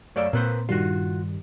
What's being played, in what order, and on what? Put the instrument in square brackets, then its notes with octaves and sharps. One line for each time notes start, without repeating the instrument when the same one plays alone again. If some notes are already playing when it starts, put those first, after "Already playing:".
[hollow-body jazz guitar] F#2 A3 D5 [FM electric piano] C#5 F5 E6
[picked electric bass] A#2 C4 [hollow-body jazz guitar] A#3 B4 C5
[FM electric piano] G2 D#3 G3 [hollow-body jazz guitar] F4 F#4